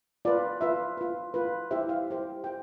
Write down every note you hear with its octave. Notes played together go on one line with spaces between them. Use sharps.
F4 B4 D5
F4 B4 E5
F4 B4
F4 B4
E4 G4 C5 E5
F5
E4 G4 C5
G4 C5 G5